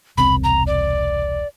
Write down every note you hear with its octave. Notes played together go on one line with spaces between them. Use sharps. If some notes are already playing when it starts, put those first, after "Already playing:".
E1 C2 C4 B5
A#5
D5